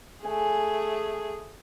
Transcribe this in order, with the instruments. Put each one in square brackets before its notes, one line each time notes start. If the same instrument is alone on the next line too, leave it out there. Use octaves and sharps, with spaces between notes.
[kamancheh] A3 G#4 [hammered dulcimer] G#5